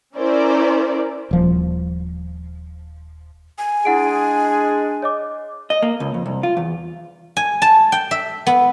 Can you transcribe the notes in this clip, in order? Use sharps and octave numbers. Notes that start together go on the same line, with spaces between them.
C#4 E4 A#4 C5 D5
D#1 F3
G#5
G#3 D4 E4 G#4 F#5 D7
C#5 D#5 D6
D#5
A#3
C#2
F2
C2
F4
E2
G#5
A5
G5
E5
B3